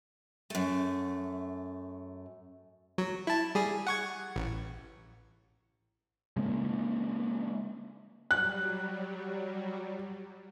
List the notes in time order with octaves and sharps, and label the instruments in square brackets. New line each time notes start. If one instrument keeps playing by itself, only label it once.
[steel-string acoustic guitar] F#2 A3
[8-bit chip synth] F#3
E4 A5
G3 G#4
F#5 C#6 G#6
A1
[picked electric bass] C#3 G#3 A#3 C4
[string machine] F#3 G3 [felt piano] F#6